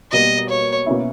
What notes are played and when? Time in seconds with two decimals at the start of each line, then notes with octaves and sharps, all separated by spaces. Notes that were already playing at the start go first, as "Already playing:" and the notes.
0.12 B2 G3 A#3 D#5
0.49 C#5
0.86 B2 A#3 C#4 E4